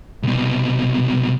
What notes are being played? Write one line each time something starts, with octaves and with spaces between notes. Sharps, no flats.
C2 B2